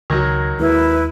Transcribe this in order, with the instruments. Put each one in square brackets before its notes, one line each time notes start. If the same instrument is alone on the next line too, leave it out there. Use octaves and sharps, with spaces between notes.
[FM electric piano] C#2 G#6 A#6 [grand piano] D#3 F#3
[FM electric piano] D#2 G#3 [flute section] E4 B4